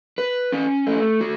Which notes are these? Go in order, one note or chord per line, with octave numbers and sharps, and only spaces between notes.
B4
C#4
A3
F#4